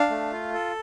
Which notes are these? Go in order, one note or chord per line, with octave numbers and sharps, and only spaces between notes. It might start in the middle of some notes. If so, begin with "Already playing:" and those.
Already playing: D4 F5
A3
F4
A4